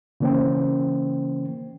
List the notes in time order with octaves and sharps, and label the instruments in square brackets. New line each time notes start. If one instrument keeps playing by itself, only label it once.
[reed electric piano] C#3 E3 A#3 C#4 C5 G5